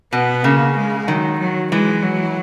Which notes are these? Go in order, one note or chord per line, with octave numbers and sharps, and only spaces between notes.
B2 B3
C#3 A#3
G#3
D#3 F#3
F#3
E3 G#3
F#3